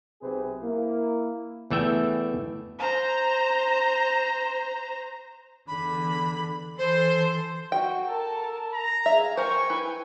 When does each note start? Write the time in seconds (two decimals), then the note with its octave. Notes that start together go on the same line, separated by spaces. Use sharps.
0.21 B1 C3 C4 G#4 B4 C5
0.62 A#3 E4
1.70 E2 E3 A3 E5 G5
2.79 C5 A#5
5.68 E2 D3 B5
6.78 E3 A4 C5 C6
7.72 F#4 G5
8.08 A4 A#4 A5
8.73 A#5
9.06 G#4 E5 F5
9.37 A#4 C5 G5 G#5 C#6
9.70 E4 B4